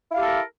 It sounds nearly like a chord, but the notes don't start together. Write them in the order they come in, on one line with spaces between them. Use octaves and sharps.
E4 F5 G4 A4 A#4